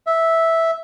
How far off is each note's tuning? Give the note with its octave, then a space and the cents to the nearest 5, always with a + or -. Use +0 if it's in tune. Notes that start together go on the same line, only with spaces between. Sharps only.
E5 -5